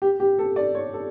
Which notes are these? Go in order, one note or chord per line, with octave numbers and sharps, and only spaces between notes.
G4
G4
A4
D5
C#5
A4